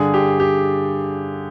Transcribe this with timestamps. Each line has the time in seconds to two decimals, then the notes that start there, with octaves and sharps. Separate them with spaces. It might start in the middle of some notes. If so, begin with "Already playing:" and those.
Already playing: G2 D3 G#4
0.14 G4
0.40 G4